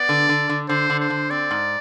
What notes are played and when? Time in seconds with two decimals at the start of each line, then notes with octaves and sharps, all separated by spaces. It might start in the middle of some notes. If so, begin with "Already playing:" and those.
Already playing: B3 D5
0.09 D3
0.29 D3
0.49 D3
0.69 D3 C5
0.90 D3
1.00 C5
1.10 D3
1.31 C4 D5
1.51 G#2